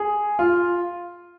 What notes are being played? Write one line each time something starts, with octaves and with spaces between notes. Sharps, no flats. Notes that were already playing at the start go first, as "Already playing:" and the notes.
Already playing: G#4
F4